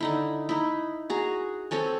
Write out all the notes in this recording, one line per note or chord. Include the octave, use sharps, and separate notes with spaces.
D3 D#4 E4
D#4 E4
F#4 G#4 A#5
C4 A4 C#5 G#5